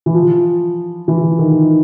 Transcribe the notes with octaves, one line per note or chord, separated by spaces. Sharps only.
E3
F3
E3
D#3